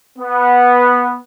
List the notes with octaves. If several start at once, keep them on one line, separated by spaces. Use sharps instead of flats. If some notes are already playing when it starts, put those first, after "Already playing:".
B3